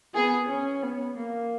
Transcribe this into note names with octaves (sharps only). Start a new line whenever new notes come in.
B3 G#4
C#4
B3
A#3